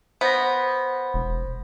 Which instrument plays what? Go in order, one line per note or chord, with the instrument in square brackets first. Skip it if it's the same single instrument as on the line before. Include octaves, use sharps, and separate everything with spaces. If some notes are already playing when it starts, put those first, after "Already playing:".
[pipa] B3 [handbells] C5 A#6
[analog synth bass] E1